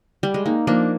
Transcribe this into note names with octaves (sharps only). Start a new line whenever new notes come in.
G3
G#3
A#3 D#4
F3 A#3 D4